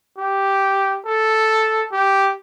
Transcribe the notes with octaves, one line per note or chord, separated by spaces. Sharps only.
G4
A4
G4